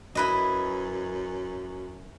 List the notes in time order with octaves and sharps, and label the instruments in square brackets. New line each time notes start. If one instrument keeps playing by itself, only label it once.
[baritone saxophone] F#2 [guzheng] E4 B4 D#5